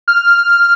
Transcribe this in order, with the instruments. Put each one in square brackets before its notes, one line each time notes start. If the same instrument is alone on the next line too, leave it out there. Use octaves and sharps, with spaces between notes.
[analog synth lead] F6